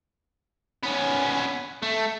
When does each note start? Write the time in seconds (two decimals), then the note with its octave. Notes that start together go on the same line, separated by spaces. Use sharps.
0.83 B3 C#4
1.82 A3